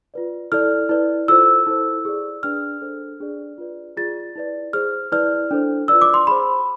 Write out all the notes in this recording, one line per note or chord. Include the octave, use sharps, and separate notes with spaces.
F4 B4 D5
E4 A4 D5 F6
E4 B4 D5
F4 A4 C5 E6
E4 A4 C5
G#4 D5
D4 G#4 B4 D5 F6
D4 A4 C5
D4 G#4 D5
F4 B4 D5
F4 G#4 D5 A6
E4 B4 D5
G#4 C5 F6
E4 B4 D5 F6
D4 A4 C5
F4 B4 D5 E6
D6
C6
G#4 C5 B5